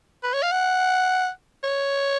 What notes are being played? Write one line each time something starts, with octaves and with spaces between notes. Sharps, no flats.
B4
C#5
F5
F#5
C#5